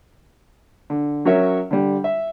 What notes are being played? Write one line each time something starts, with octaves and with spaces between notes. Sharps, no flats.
D3
F#3 C#4 A#4 C#5 E5
D3 G3
E5